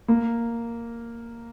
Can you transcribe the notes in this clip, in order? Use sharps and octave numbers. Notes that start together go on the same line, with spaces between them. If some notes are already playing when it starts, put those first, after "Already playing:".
A#3